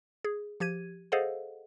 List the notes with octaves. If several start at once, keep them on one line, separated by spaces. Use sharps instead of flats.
G#4
F3 G4 G#6 D#7
G#4 A4 C5 D#5 F5 F#5